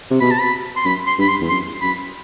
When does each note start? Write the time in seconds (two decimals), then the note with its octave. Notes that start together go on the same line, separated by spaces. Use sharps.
0.10 C3
0.21 B2 B5
0.31 A5
0.40 B5
0.77 C6
0.85 F#2 B5
1.07 C6
1.18 G2 B5
1.29 C6
1.40 E2
1.49 F#2 C6
1.81 F#2 B5